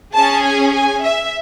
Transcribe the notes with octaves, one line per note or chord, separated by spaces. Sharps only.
C#4 G#4 A5
G#5
G#5
E5